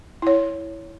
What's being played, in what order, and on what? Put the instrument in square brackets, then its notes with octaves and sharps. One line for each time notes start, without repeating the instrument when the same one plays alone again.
[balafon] E4 C#5